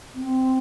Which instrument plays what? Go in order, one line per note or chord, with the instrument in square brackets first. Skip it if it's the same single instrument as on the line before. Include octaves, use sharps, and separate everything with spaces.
[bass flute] C4